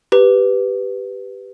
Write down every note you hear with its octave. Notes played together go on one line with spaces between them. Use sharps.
G4 B4